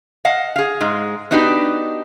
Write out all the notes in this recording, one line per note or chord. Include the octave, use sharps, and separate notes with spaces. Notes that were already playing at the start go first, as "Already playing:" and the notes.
D#5 F5 F#5 A5
G#4 F5
G#2 G#3
B3 D4 D#4 F#4 G4 B4